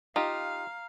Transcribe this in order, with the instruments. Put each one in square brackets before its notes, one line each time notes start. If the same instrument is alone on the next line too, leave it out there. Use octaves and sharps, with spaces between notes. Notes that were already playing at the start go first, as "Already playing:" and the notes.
[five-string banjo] D#4 [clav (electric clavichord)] F4 G4 [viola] F5 [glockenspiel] A#5 F6